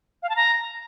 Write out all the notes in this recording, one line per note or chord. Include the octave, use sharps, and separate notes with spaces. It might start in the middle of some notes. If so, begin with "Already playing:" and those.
F5
A5
A#5